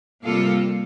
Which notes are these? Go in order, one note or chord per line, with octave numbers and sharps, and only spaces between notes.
C3 G3 A#3 F4 A4